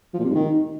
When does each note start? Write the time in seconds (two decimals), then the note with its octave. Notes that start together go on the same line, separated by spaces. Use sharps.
0.14 F3
0.19 A#2
0.24 C3
0.30 G#2
0.35 D#3